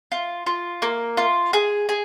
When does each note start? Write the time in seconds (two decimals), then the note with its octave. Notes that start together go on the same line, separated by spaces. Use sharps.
0.12 F4
0.46 F4
0.82 A#3
1.17 F4
1.53 G#4
1.89 G#4